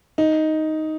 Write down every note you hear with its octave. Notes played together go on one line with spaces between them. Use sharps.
D#4